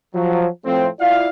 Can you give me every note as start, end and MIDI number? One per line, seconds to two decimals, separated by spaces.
0.14 0.47 53
0.14 0.47 54
0.65 0.87 45
0.65 0.87 53
0.65 0.87 57
0.65 0.87 60
1.00 1.29 64
1.00 1.29 65
1.00 1.29 74
1.00 1.29 77